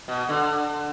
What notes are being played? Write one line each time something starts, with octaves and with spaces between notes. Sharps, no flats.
B2
D3